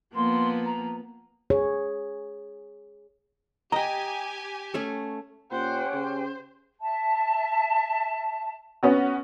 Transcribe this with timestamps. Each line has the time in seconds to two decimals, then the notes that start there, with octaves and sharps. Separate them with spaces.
0.15 F3 A#3 B3 C6
0.64 A#5
1.50 G#4 C#5
3.72 G4 D#5 G5 G#5 A#5
4.74 A3 C#4 A4
5.51 A#2 C#4 G4 C5 F#5 G5
5.94 C#3 C5
6.81 E5 A5
8.83 B3 C#4 F#4